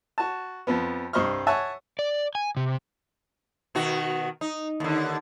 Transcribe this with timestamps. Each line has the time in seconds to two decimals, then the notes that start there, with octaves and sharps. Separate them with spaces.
0.18 F#4 A5
0.67 F2 F3 B3
1.13 C2 G2 C5 D#5 C#6 F6
1.47 C#5 E5 F#5 G#5 A5
1.99 D5
2.35 G#5
2.57 C3
3.75 B2 D#3 F#4
4.41 D#4
4.80 D#2 D3